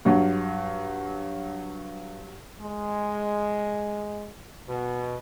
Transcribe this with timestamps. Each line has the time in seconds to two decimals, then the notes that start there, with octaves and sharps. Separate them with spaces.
0.05 G2 F#3
2.61 G#3
4.69 B2